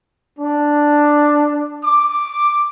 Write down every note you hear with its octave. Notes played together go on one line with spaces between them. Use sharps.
D4
D6